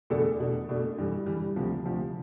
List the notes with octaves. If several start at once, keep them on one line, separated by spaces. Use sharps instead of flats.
E2 B2 A3 D4 A4
B2 A3 D4
B2 A3 D4
G2 E3 G3
G2 E3 G3
D2 C3 F3
D2 C3 F3